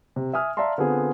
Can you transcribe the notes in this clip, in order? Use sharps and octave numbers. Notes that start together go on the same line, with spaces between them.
C3
E5 G#5 D#6 F6
D5 E5 F5 A5 A#5 C6
D3 B3 C4 F4 G#4